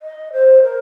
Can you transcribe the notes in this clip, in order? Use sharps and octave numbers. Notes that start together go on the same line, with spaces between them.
D#5
C5
A#4